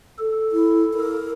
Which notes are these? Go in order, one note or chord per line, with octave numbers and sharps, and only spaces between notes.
A4
E4
A#4